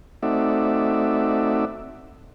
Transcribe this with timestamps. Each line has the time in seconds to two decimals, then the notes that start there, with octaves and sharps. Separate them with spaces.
0.23 A3 C4 D#4 F#4 D5 E5